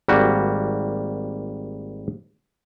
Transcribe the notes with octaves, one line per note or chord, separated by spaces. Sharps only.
G#1 G3 A#3 F#4